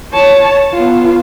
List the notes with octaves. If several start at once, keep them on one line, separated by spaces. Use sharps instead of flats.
C#5 A5
B3 F4